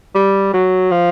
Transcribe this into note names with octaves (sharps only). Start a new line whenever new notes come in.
G3
F#3
F3